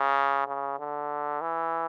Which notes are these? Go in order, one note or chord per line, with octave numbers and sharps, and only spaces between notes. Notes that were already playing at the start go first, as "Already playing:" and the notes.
Already playing: C#3
C#3
D3
E3